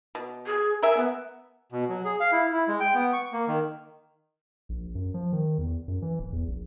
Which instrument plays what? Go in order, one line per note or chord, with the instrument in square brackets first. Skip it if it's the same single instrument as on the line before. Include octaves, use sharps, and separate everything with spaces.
[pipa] B2
[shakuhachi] G#4
[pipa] A#4 E5 [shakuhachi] G#5
[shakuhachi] B3
[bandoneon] B2
F#3
G#4
F5
E4
E4
G#3
G5
B3
C#6
A#3
D#3
[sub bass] A#1
F#2
F3
D#3
E2
F#2
E3
D1
E2
A#1